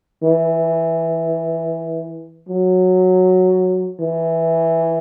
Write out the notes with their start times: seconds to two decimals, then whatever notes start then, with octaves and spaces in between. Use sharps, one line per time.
0.23 E3
2.49 F#3
4.00 E3